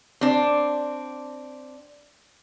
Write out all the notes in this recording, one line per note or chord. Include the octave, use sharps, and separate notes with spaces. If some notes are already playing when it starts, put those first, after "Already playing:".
C4 D4